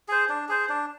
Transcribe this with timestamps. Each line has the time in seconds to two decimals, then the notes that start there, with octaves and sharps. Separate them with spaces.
0.08 G#4 C5
0.29 D4
0.49 G#4 C5
0.69 D4